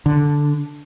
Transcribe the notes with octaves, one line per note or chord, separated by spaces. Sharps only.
D3